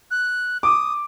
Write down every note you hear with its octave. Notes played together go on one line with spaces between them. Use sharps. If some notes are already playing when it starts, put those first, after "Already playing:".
F#6
D6 D#6